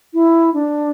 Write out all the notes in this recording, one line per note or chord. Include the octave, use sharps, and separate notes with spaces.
E4
D4